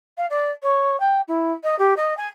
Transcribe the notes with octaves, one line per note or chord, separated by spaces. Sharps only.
F5
D5
C#5
G5
E4
D#5
G4
D#5
G#5